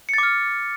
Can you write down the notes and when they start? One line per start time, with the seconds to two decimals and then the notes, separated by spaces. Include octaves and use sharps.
0.09 C#7
0.14 A6
0.18 D6
0.23 F6